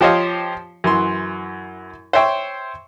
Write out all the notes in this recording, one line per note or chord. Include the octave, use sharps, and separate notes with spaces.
F3 G4 C5 C#5 D#5 F5
F#2 E3 C6
C5 C#5 E5 G5 C#6